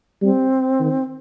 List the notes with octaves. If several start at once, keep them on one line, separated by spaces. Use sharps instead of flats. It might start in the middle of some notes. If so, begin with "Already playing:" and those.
G3 C4
D#3